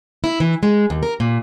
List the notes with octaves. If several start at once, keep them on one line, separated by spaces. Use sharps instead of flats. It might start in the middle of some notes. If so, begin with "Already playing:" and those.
E4
E3
G#3
D#2
A#4
A#2